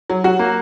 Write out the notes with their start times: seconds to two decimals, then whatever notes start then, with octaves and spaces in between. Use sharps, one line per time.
0.10 F#3
0.24 F#3 F#4
0.39 A#3